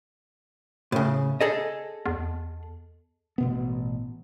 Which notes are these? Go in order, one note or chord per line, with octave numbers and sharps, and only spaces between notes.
A2 C#3
G#4 A4 D#5
E2
A1 B2 B3